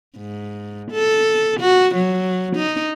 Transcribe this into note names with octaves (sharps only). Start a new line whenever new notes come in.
G#2
A4
F#4
F#3
D#4